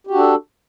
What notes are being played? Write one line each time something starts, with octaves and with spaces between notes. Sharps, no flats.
D4 F#4 G4 A4